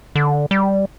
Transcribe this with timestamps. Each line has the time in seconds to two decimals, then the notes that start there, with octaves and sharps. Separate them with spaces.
0.16 D3
0.51 G3